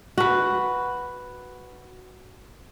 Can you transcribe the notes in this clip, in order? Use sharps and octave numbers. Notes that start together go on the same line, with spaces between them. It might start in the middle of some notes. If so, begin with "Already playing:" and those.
F#4 B4